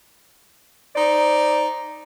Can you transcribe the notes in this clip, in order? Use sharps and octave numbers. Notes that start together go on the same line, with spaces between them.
D#4 C5 D5